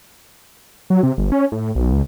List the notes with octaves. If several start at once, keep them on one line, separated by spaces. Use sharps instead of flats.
F#3
C3
G1
C#4
A2
B1
C#2